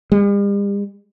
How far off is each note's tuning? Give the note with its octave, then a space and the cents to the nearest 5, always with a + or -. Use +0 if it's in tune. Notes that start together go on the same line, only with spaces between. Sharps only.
G3 +45